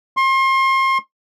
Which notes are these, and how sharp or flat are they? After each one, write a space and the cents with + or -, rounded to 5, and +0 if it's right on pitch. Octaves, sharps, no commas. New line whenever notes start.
C6 +35